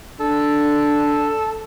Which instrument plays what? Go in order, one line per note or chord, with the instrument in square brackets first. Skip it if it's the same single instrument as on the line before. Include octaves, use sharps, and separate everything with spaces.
[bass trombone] D4 [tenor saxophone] A4